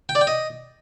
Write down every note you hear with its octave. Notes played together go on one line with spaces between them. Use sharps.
G5
D5
G5
D#5